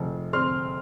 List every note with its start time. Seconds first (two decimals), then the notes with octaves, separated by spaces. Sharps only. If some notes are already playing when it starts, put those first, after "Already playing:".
Already playing: F1 F3
0.33 C4 C6 F6